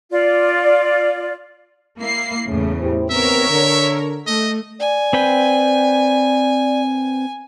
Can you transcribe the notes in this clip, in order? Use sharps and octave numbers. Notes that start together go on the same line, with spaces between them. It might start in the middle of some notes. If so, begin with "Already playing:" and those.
F4 D5
A#3 E4 C7
E2 A2 C#3
E4 G4 C5
D#2 B3 C4 A#4 C#5 E5
D3
A3 D#5
D5 G#5
C4 B4 G5